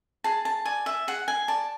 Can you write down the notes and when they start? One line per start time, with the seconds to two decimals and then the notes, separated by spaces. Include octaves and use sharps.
0.24 G#4 A5
0.45 A5
0.65 D5 G#5
0.86 E5
1.08 G#4 F#5
1.28 G#5
1.48 D5 A5